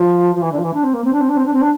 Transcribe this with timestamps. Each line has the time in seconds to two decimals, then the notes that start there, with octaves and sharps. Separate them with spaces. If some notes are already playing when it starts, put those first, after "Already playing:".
Already playing: F3
0.36 F3
0.42 E3
0.52 D3
0.58 F3
0.63 E3
0.74 D4
0.83 C4
0.94 A#3
1.04 C4
1.13 D4
1.20 C4
1.29 D4
1.37 C4
1.46 D4
1.53 C4
1.62 D4